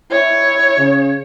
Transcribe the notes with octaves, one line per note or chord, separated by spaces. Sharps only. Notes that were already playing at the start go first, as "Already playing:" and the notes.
E4 C#5
C#3